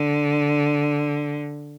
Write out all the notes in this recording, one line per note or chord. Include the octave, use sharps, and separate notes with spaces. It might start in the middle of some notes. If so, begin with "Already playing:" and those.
Already playing: D3